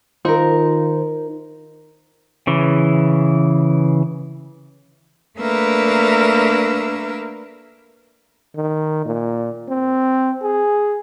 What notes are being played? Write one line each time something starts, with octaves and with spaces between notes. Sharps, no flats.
D#3 D#4 F4 A#4 C5
C#3 E3
A3 A#3 D4 A#4 B4 E6
D#3
A#2
C4
G#4